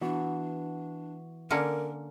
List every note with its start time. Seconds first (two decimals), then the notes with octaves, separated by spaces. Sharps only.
0.01 E3 B3 D4 F#4
1.51 D3 A#3 C#4 A#4